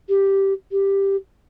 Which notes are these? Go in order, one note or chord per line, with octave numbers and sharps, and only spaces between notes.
G4
G4